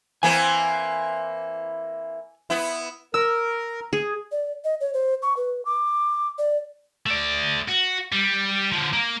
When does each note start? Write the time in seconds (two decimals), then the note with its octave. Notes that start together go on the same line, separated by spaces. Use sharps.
0.23 E3 A#3 C4 G#5
2.50 B3 E4
3.14 A#4 E6
3.93 G#4
4.32 D5
4.64 D#5
4.81 C#5
4.94 C5
5.22 C#6
5.37 B4
5.65 D6
6.38 D5
7.06 A3 D5
7.68 F#4
8.12 G3
8.72 D3 F3
8.93 A#3